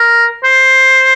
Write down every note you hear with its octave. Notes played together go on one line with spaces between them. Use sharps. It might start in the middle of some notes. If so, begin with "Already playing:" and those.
Already playing: A#4
C5